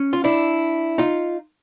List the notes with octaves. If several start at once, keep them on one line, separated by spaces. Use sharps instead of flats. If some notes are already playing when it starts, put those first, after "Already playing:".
Already playing: C#4
F4
D4 E4
D#4 F4